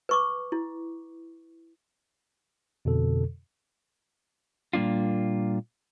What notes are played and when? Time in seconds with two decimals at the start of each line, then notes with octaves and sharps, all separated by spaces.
0.09 B4 C#6 D6
0.52 E4
2.85 F2 B2 D3 A4
4.73 A#2 G3 A#3 D4 F4